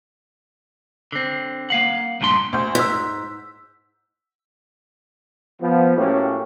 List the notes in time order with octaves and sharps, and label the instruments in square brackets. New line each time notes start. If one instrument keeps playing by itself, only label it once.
[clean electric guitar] D3 C4
A#3 F5 F#5
D2 G2 A#2 D4 C6
[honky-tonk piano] D2 C5 G6
[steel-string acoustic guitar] G#2 [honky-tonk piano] E6 B6
[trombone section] F3 B3
A2 F#3 A#3 C#4 G4